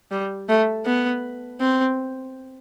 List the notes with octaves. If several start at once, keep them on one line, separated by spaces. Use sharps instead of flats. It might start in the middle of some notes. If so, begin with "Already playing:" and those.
G3
A3
B3
C4